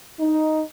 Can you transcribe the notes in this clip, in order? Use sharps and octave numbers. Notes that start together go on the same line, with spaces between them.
D#4